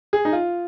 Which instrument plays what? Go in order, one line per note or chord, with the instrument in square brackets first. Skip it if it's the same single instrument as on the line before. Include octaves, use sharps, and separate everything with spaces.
[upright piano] G#4
D#4
F4